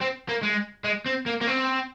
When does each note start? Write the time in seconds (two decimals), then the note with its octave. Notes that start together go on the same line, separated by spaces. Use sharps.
0.01 C4
0.29 A#3
0.43 G#3
0.84 G#3
1.06 C4
1.26 A#3
1.41 A#3
1.47 C4